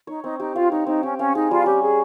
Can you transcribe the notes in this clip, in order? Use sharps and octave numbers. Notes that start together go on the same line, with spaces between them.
D#4 C#5
C4 D#4
D#4 G4
F4 F5
D#4 C#5
C4 D#4
C#4 G4
C#4 F5
D#4 G#4
G3 F4
C#4 G4
G#4 C#5